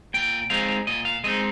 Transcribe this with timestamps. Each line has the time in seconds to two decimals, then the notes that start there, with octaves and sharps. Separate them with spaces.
0.14 A#2 G5
0.50 G#3 C4 D#4 F5
0.87 A#2 D#5
1.05 F5
1.24 G#3 C4 D#4 D#5